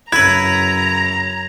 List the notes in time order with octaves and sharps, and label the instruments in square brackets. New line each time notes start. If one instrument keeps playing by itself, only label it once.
[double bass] F#2 C#3 [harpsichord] E4 B4 [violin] A#5 [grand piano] G#6